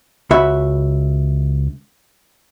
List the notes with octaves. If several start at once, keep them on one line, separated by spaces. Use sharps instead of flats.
C#2 F#4 E5 B5